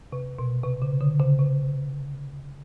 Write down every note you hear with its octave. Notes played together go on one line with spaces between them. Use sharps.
C3
B2
C3
C#3
D3
C#3
C3